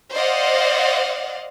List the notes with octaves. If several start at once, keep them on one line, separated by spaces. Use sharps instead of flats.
C5 D5 D#5 F5 F#5